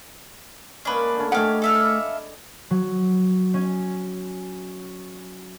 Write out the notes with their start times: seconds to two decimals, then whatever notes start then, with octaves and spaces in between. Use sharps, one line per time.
0.85 G#3 A#3 C#4 D4 B4
1.16 D3 A3 C#4
1.32 A3 G4 G#4 D#5 F5 F#5 B5
1.62 A4 E5 F5
1.80 D5 D#5 B5
2.71 F#3
3.54 C#4